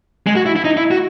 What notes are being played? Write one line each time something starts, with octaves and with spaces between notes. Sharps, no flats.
G#3
F#4
E4
E4
D#4
E4
F#4